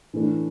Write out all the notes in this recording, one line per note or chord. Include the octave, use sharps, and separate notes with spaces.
A2 E3 A3 D4